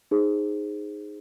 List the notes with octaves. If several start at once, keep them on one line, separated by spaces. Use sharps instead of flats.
D#4 G#4 C5